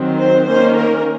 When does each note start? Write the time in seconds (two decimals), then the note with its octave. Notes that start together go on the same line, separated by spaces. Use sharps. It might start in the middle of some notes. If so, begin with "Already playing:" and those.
Already playing: D#3 F#3 C4
0.19 C5
0.47 D#3 A#3 C#4 C5
0.76 A#4